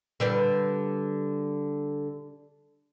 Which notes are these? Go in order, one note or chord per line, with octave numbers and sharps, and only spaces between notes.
D3 G3 B4